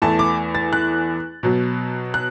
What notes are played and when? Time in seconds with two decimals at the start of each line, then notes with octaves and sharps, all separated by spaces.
0.02 E2 E3 A3 A5
0.19 D6
0.55 A6
0.73 F#6
1.43 B2 F#3 B3
2.14 F#6